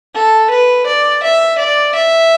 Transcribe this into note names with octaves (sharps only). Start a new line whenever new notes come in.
A4
B4
D5
E5
D5
E5